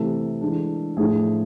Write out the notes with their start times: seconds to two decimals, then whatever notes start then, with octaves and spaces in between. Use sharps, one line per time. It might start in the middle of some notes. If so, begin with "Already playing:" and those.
Already playing: C3 E3 A3 A4
0.41 E3 G#3 D4
0.97 A2 F3 A3 D4 F4 G#4